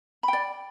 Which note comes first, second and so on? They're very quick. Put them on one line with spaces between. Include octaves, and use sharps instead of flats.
B5 G5 D5